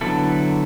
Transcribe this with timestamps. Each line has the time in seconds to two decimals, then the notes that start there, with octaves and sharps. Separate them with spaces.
0.01 D3 F#3 B3 E4 A4